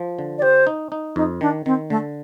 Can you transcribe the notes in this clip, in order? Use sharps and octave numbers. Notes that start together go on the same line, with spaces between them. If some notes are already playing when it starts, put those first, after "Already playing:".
Already playing: F3
D3
D5
G4 C5
D#4
D#4
F2 D#4
D#3 D4
D#3 C4
D3 A3